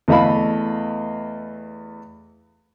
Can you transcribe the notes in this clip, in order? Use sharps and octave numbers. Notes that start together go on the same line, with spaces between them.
E2 A3 D#5 F5 B5